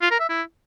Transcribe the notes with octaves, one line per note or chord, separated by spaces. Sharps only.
F4
A#4
E5
E4